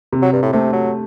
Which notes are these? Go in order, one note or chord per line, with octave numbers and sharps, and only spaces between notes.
C3
F#3
G2
A2
C3 A3
F#3